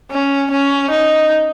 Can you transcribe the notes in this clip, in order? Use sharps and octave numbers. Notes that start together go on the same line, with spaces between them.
C#4
C#4
D#4